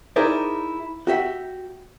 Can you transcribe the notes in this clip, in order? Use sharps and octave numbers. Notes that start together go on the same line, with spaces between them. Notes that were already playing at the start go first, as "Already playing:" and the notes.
D#4 E4 G#4 A#4 C5 D5
F#4 G4 E5 F#5